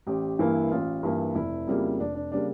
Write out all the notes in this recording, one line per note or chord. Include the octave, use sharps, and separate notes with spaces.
A1 G4
G2 E3 A#3 E4
A1 F4
G2 E3 A#3
F1 E4
F2 C#3 G3 A#3
F1 D4
D4
C#3 G3 A#3 D4